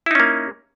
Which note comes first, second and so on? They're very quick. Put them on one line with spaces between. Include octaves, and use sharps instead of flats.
E4 D#4 C#4 A#3